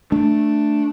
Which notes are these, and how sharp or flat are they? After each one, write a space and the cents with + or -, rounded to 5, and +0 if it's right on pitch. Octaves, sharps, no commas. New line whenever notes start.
A3 +0 D4 +5